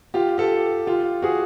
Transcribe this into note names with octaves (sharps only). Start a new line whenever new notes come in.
F4 G4
G4 A4
F4 G4
F#4 G#4